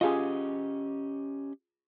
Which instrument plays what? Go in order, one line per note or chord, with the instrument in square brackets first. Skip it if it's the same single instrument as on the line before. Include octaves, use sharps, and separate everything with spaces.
[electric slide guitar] C#4 G4 D#5 [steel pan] F4 G#4